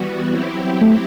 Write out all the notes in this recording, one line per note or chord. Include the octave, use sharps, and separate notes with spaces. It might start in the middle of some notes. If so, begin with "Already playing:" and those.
Already playing: E3 G3 B3 F#4
F#3 C4 E4 G4
A3